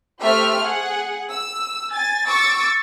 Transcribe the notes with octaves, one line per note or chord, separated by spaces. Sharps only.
A3 G4 C5 E5 F6
G#4 F#5
E6
G#5 A6
C#6 D6 E6 A6